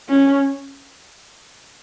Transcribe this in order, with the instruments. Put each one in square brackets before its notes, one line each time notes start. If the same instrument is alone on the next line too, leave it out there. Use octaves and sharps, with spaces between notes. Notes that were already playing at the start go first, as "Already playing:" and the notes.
[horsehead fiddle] C#4